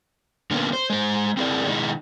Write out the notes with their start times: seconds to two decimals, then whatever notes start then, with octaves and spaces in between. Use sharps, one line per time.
0.51 D3 A#3 B3 C#4
0.73 C5
0.90 G#3 C5
1.37 C4 E4 G#4 A#4 D5
1.67 B2 D#3 G#3 D#4 E4